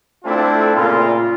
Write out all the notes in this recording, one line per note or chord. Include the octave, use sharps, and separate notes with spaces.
A3 C4 D4 E4 F4 A4
A#2 C#3 F4